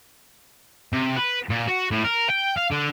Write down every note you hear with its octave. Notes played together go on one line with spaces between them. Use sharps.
C3
B4
A#2
F#4
A2
A#4
G5
F5
D3